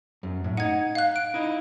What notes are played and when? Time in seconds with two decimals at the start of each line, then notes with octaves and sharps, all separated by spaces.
0.23 F#2
0.44 A2
0.57 D#4 F#5 G#6
0.95 F5 F#6
1.16 D7
1.34 D#4 E4